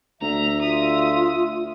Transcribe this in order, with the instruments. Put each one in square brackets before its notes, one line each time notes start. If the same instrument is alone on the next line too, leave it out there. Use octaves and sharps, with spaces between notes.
[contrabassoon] D2 [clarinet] E5 [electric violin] A#5
[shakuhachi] F4 [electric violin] D#6